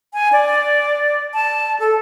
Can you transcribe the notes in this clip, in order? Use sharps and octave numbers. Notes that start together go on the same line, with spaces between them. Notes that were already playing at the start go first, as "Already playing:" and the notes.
G#5
D5
A5
A4